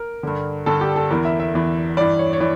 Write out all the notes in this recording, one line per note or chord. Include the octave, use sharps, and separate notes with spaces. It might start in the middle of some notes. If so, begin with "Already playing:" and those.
Already playing: A#4
G2 D3
G2 D3 A4
G4
A4
E2 E3 A#4
E5
E5
E2 E3
G2 E3 D5
C#5
C#5
E3 D5